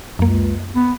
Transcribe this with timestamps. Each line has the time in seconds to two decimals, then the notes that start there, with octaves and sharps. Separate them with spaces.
0.19 C#2 F#2 A#3
0.76 B3